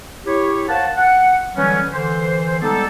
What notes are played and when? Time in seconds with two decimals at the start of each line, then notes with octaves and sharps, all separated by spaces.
0.26 E4 G4 C#5
0.68 A#4 C5 C#5 F5 F#5 A5
0.96 F#5
1.56 D3 E3 F#3 G3 B3 C#4
1.92 D3 E3 C5
2.62 G3 G#3 B3 D#4 G4 A4